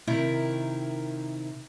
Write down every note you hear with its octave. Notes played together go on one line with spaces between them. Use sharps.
C3 D#3 E4 A#4